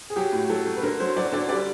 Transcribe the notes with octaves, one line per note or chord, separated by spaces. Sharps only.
G#4
F#3 G4
A2
F#3 A4
F#3
B4
D3 A#4
F#3 C5
F#3 D5
D3 D5
G3 D5